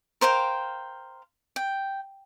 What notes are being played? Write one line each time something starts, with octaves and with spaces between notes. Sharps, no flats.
A#4 C5 F5 G5
G5